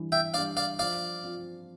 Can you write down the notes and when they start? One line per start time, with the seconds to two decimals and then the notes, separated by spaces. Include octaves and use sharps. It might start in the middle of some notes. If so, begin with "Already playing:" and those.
Already playing: E3 G3 D4
0.12 E5 G5
0.34 G3 D4 D5 F5
0.57 D5 F5
0.79 F3 D5 F5
1.23 C4 F4